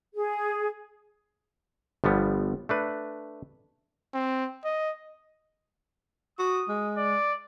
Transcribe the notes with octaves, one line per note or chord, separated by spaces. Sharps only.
G#4
G1 F3 G3 B3
A3 D4 B4
C4
D#5
F#4 D#6
G#3
D5